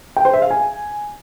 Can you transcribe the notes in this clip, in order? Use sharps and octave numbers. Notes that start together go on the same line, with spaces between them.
G5
C5
E5
F5
G#5